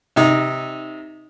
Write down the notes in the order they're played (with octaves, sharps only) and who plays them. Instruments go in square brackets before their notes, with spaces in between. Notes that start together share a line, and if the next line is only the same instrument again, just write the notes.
[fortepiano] C3 D#4